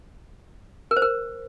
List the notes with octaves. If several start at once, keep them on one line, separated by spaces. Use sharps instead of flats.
A#4
C5
A#4